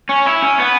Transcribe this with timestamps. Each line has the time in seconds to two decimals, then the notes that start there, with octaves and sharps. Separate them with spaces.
0.09 C#4
0.27 E4
0.42 C#4
0.59 B3